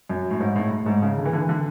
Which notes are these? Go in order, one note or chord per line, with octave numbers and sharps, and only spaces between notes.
F#2
A2
G#2
A2
A2
G#2
C#3
D3
E3
D3
E3
D3